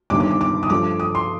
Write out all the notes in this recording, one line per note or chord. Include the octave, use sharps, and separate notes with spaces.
G1 G2 D#3 D6
D6
D6
D6
D#6
G2 F3 A3 D6
D#6
C6